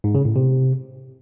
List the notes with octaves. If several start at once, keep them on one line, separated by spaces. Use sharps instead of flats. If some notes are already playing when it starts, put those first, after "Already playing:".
G#2
C#3
A2
C3